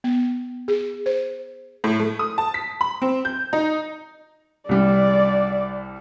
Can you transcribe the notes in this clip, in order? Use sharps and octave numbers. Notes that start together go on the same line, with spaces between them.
B3
G#4
C5
A2
A3
D#6
A5
B6
B5
C4
G6
D#4
C2 G3 D5